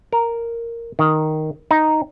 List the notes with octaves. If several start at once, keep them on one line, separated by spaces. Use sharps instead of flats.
A#4
D#3
D#4